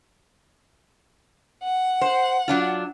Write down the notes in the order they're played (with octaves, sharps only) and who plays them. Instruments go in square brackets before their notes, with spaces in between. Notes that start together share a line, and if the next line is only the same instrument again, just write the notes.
[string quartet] F#5
[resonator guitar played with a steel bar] C5
F#3 D4 F4